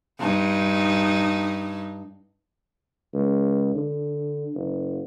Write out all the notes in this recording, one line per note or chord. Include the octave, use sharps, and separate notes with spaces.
G2 D#4
C#2
D3
F#1